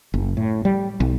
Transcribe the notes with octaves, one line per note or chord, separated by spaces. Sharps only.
F#1
A2
G3
B1